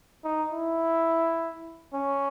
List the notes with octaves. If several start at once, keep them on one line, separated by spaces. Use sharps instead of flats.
D#4
E4
C#4